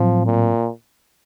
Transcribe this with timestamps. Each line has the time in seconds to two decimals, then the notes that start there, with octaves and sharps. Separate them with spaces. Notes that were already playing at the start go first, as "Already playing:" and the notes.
Already playing: A2 F3 F#3 C4
0.26 A#2